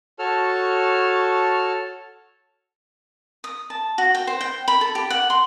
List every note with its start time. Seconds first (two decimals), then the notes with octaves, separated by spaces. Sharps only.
0.19 F#4 A4 C#5 A5 F6
3.44 D#6
3.70 A5
3.98 F#4
4.15 G5
4.27 C5
4.41 G5
4.68 B5
4.81 A4
4.95 G4
5.10 F#5
5.30 C6